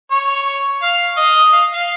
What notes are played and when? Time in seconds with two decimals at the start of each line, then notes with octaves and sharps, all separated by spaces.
0.11 C#5
0.82 F5
1.17 D#5
1.52 F5
1.74 F5